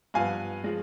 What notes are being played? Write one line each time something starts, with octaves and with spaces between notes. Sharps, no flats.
G2 F3 B3 F5 G#5
F3 G#3